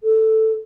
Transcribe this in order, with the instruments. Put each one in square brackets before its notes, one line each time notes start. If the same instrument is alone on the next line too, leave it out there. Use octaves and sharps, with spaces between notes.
[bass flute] A4